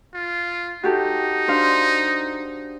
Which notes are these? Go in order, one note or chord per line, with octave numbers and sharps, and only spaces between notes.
F4
D#4 F#4 G4 A4
D4 C5 F5